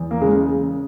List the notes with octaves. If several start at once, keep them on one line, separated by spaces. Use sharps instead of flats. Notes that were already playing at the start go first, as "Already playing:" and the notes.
Already playing: E2
A#3
C#3 G#3